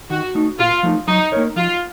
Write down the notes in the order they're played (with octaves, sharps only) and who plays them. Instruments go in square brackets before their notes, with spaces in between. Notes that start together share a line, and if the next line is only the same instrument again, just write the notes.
[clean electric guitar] D#3 [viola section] F#4
[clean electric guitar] A3 D#4
[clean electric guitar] A#2 [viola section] F4
[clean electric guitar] F3 A3 D#4
[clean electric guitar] F#3 [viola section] D#4
[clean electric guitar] A#3 D#4 A#4 C#5
[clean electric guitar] F3 [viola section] F4